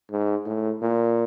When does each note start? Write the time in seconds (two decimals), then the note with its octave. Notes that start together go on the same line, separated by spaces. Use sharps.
0.11 G#2
0.45 A2
0.82 A#2